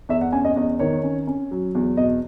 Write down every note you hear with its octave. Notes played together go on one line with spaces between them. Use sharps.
E2 E5
F#5
C#4 G#5
D#5
E2 D#5
D#3 C#5
C#4
C#4
F#3
E2
B2 D#5